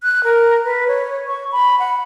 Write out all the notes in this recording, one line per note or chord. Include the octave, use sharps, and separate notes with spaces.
F#6
A#4
B4
C#5
C#6
B5
F#5